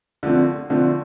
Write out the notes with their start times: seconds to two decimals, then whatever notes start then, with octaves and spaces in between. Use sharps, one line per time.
0.23 D3 F3 A3 C4
0.70 D3 F3 A3 C4